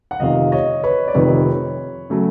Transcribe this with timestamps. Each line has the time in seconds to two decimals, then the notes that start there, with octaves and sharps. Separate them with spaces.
0.11 F#5
0.20 F1 F2 C3 D#3 D#5 F5
0.52 C#5 D#5
0.83 B4 C#5
1.08 D5
1.14 F1 F2 C3 D#3 B4 C#5
2.10 C#3 F#3 A3